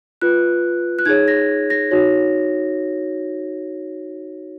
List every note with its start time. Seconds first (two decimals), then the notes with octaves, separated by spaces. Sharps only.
0.22 F4 B4 F#6
0.99 F#6
1.06 D#4 G#4 C#5 G#6
1.28 A#6
1.70 A#6
1.91 D#4 F#4 C#5